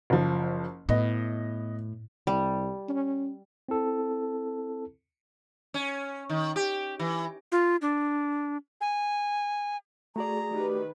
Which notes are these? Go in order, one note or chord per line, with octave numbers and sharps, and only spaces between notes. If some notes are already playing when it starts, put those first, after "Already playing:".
F#1 F3
A2 B3 D#5
C2 G3
C#4
C4 E4 A4
C#4
D#3
G4
E3
F4
D4
G#5
A3 F#4 G#4 D5 A#5
D#3 G4 B4